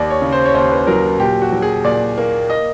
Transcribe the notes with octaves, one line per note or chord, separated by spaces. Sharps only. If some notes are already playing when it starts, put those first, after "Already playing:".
Already playing: D#2 D5
C#5
C#3
C5
C#5
D#2 C5
B4
F#3 A#4
A#2 G4
F#4
F#3
G#4
A#2 D5
A#3
D#5